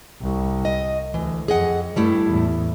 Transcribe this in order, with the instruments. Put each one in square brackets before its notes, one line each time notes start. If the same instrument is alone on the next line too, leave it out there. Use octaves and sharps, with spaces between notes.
[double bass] C2
[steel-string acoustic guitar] D#5
[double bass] D2 [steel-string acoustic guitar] E3
[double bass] F2 [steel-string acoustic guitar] G#4 D#5 F#5
[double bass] G2 [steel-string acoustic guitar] G3 A3 E4
[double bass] E2 A2